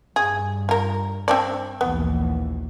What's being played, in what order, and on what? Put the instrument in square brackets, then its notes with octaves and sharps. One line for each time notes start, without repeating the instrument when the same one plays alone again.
[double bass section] G2 [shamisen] G#4
[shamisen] F4 A#4
C4 D4 D5
[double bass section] A#1 D#2 E3 [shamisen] B3